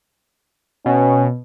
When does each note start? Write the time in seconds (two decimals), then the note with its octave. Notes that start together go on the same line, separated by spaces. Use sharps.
0.86 B2 C#4